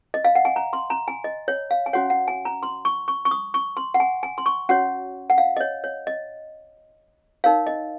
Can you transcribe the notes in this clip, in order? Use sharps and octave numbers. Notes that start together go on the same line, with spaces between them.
D#5
F5
F#5
G#5
A#5
C6
A#5
G#5
D#5
C#5
F5
G#5
C#4 F#4 C#5 F#5
F#5
G#5
A#5
C6
C#6
C#6
C#6
D#6
C#6
C6
F#5
G#5
G#5
C6
C#6
C#4 F#4 C#5 F#5
F#5
F5
D#5
C#5
C#5
D#5
D#4 A#4 C#5 F5
D#5